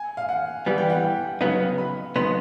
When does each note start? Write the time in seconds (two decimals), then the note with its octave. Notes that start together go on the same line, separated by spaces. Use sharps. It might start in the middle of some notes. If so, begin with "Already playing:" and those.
Already playing: G#5
0.17 F5
0.29 F#5
0.66 E3 G3 B3 G#5
0.78 G5
0.90 F#5
1.03 G5
1.41 C#3 F#3 B3 D#4 F5
1.78 B5
2.16 C#3 F#3 B3 D#4 C6